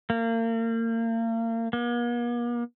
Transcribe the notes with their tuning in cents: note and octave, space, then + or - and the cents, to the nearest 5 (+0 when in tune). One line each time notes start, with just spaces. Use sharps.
A#3 -35
A#3 +45